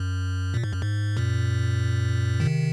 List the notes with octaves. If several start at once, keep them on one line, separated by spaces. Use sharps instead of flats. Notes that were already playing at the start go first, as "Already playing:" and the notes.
Already playing: F#2
A#2
G#2
F#2
G#2
F#2 A#2
C3 D#3